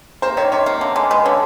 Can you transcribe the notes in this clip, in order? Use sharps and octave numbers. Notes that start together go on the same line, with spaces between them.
A#3 C5
D#3 C#5
C3 C#5
A#3
D3
G#3
G#3 B4
D3 C#5